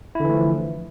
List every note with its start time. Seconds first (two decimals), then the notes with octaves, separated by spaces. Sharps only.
0.15 E4
0.20 D3
0.25 E3
0.30 A3
0.34 F3